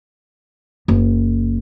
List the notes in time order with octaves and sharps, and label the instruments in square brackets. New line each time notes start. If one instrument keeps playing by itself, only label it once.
[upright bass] F#1